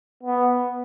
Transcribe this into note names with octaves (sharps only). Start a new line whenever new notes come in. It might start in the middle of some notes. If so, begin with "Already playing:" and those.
B3